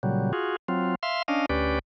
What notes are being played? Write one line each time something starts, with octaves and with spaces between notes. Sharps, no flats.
A#2 C#3 F#3 G3
F4 F#4 G#4
F#3 C4 F4
E5 F5 C6
C#4 D4 D#5 F5
D2 C#4 G4 B4 D5